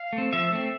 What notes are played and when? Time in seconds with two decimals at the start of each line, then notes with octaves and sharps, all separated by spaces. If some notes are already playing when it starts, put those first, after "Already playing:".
Already playing: F5
0.13 A3
0.18 C4
0.33 F3 E5
0.52 A3 C4